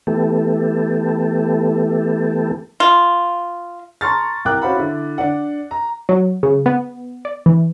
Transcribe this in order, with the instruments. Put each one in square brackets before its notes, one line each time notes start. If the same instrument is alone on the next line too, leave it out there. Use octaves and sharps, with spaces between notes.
[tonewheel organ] E3 A3 B3 G4 A4
[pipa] F4
[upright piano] A5 A#5 C6 C#6 F6 A6
C2 G4 A#4 G5 D6 F#6
C#4 F#4 C5 F5 F#5 B5
D3 E4
D4 D5 F#5
A#5
[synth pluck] F#3
C#3
B3
D5
E3